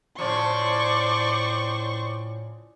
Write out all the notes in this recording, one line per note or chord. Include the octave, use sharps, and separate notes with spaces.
A2 C#3 F3 C5 D5 C#6